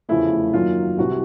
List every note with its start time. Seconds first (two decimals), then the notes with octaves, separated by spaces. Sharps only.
0.09 F1 E2 C#3 F3 A3 E4
0.53 F#2 D#3 F#3 A#3 F4
0.97 C2 C3 E3 F#4